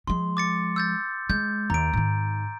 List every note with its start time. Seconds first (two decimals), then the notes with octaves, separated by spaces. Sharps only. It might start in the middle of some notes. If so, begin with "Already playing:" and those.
0.07 F3 G#3 C6
0.37 D6 A6 C#7
0.76 E6 G6 A6
1.30 G#3 G6
1.70 D#2 A#5 D7
1.93 G#2 D#3